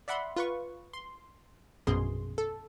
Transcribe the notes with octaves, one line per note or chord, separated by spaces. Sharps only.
D5 E5 F#5 B5 C6
F4 B4 C#6
C6
A#1 F#2 B2 G#4 C6
A4